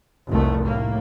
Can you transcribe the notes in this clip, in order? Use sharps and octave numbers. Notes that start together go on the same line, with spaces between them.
F1 C2 D#3 A3
A2 A#3